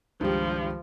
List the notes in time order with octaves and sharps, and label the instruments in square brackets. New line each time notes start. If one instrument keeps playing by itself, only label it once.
[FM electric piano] C#2 D#3 G#3 [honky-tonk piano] G2 G4 [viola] F3